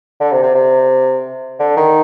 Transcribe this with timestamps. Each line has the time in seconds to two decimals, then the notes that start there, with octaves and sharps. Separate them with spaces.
0.20 D3
0.32 C3
0.43 C3
0.54 C3
1.59 D3
1.77 D#3